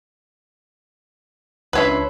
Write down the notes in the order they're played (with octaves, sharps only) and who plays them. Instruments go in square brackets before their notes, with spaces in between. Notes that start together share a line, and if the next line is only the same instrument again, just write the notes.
[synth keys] C#2 D4 C6 [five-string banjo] B4 C#5 E5